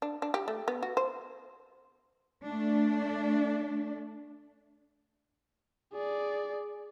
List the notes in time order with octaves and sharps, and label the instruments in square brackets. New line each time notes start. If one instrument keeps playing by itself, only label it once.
[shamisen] D4
D4
G4
A3
B3
F#4
C5
[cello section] A3 D4
[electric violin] G#4 D5